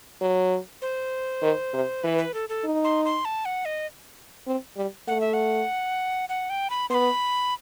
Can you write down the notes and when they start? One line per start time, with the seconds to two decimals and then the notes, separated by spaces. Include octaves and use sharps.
0.21 F#3
0.82 C5
1.42 D#3
1.73 C3
2.03 E3 B4
2.18 B4
2.34 A4
2.49 A4
2.64 D#4
2.84 C6
3.05 C6
3.25 A5
3.45 F#5
3.65 D#5
4.47 C4
4.77 G3
5.08 A3 F#5
5.21 E5
5.34 F#5
6.29 F#5
6.50 G5
6.70 B5
6.90 B3 B5 C6